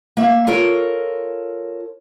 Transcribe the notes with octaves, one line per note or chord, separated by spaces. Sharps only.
A#3 E5
F4 A4 A#4 C#5